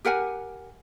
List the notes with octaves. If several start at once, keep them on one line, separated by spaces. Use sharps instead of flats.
G4 A#4 F#5 G#5